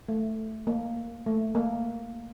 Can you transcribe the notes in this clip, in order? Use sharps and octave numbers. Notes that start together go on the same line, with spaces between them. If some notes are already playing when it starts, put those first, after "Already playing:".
A3
A#3
A3
A#3